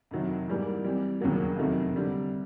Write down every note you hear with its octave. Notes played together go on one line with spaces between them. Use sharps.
F2 C3 D#3 F#3
G#2 E3 G3 A#3
E3 G3 C4
E1 D#2 C#3 F#3 A#3
F2 C3 D#3 F#3 A3
D3 G3 C4